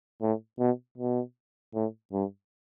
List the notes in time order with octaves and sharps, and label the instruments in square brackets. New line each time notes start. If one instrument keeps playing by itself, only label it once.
[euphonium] A2
B2
B2
A2
G2